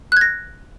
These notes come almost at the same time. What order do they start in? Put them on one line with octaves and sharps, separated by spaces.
F#6 G#6 A#6